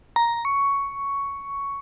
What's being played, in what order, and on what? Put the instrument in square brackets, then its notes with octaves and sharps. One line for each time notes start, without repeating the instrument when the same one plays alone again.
[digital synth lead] A#5
C#6